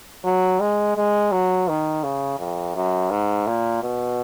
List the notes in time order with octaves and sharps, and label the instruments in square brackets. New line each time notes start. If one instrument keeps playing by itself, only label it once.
[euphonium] F#3
G#3
G#3
F#3
D#3
C#3
F2
F#2
G#2
A#2
B2